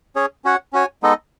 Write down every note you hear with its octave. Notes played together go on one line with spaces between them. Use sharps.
C#4 G#4 C#5
C#4 F#4 C#5 F#5
C#4 F#4 C#5 G#5
G#3 B3 D#4 A4 D#5